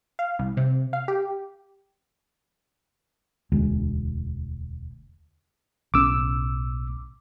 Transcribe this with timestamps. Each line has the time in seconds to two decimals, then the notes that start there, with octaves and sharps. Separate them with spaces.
0.19 F5
0.39 C2
0.57 C3
0.93 F5
1.08 G4
3.52 E1 D2 G#3
5.94 B1 A2 C#4 D6 E6